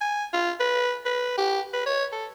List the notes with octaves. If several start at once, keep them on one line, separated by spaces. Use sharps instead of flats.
G#5
F4
B4
B4
G4
B4
C#5
A4